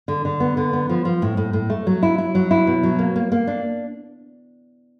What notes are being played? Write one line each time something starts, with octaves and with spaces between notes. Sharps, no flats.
D3
D3
B3
D3
B3
F3
F3
A2
A2
A2
A3
F#3
E4
E4
F#3
E4
B2
F#3
A#3
A#3
A#3
D4